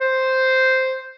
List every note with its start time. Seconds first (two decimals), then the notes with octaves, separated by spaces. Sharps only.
0.01 C5